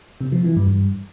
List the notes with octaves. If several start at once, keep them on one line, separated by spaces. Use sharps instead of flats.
C3
F3
E3
G2